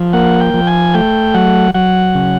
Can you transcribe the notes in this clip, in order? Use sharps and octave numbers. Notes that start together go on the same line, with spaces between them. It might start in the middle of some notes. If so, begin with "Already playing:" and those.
Already playing: F3
A#3 F#5
G5
F3
G#5
A3 G5
F#3 F#5
F#3 F#5
C#3